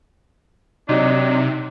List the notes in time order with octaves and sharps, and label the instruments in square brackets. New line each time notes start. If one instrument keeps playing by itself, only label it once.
[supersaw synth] C3 [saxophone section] F#3 D4 D#4